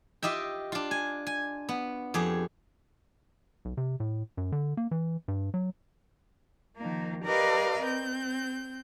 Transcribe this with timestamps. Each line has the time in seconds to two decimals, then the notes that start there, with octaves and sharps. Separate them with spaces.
0.23 F4 G4 D#5 E5 G5
0.72 D4 F4
0.91 G#5
1.27 G#5
1.69 B3
2.14 F2 G4 G#4
3.65 B1
3.77 C3
4.00 A2
4.37 F#2
4.52 D3
4.77 A#3
4.91 E3
5.28 G2
5.54 F#3
6.77 D#3 F3 A#3
7.25 G4 A#4 B4 D5 D#5 F5
7.81 C4 G6